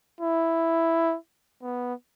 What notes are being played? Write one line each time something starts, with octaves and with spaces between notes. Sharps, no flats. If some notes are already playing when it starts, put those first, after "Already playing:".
E4
B3